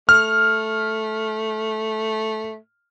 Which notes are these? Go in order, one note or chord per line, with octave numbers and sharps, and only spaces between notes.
A3 F6